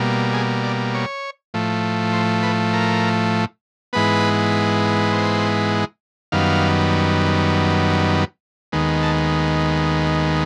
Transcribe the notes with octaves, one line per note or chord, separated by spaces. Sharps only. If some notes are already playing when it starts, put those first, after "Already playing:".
Already playing: B2 G3 A#3
G#4
D5
C#5
A2 F3 A3
C5
B4
A#4
G#2 E3 G#3 B3 B4
C5
F#2 D#3 G3 B3 F5
D#2 D#3 G#3 B3
A5